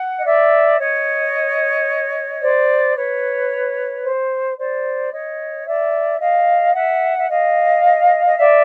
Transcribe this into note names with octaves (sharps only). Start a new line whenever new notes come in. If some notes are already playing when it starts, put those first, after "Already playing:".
Already playing: F#5
D#5
D5 E5
C#5 D#5
C5 D5
B4 C#5
C5
C5 D5
C#5 D#5
D5 E5
D#5 F5
E5 F#5
E5
D#5 F5
D#5
D5 E5